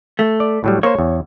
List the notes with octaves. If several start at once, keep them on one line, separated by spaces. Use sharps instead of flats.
A3
D5
A2 F#3 G3
A#3 C5 C#5
E2